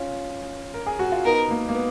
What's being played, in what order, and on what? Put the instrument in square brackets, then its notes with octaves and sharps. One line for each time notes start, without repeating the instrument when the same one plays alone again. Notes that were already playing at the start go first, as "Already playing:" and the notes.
Already playing: [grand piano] C#4 F4
A#4
G#4
F#4
F4
[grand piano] B3 D#4 [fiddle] A#4
[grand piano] A#3
A#3
B3